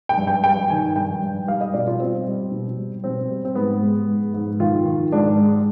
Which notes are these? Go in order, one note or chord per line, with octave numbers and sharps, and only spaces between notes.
G5
G2
G5
G2 G5
D#3 G#5
G2 G5
G2
G3 F5
D#5
B2 D5
F4
G3 C4
G3
B2
G3
B2 C4
G3
C4
G#2 B3
G#3
G#2
G#2
D#3 F4
D#3
G#2 D4
G#3